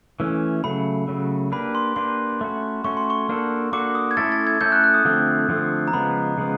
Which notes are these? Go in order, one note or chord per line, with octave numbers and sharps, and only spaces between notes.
E3 A3 C#4
C#3 F#3 A3 B5
C#3 F#3 A3
A#3 D4 G4 B4 B5
C6
A#3 D4 G4 B4 C6
A3 C#4 F#4
A3 C#4 F#4 C#6
C6
C#6
A#3 D4 F#4 A4
A#3 D4 F#4 A4 D6
D#6
G#6
A3 C#4 E4 A4 A6
A6
G#6
A3 C#4 E4 A4 G6
F#6
F#6
D#6
D3 F3 A3 C4
D3 F3 A3 C4
A#5
C#3 F3 G#3 B3 B5
C#3 F3 G#3 B3